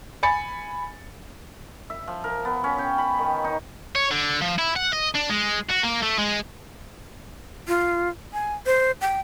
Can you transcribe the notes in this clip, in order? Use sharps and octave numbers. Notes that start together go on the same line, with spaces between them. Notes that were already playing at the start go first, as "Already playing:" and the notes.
G#5 B5 A6 C#7
E5
F3
A#4
B3
C#4
G5
B5
D#3
D#4
C#5
D3
F3
E4
F#5
D#5
D4
G#3
F#4
A#3
A3
G#3
F4
G#5
C5
G5